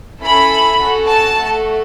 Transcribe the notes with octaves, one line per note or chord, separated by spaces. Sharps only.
C#4 E4 A4 B5
C#4 F#4 A4
A5
A3 F#4 A4